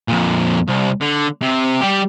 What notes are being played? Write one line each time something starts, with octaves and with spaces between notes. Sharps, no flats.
F2 A#2
C2
D3
C3
G3 G4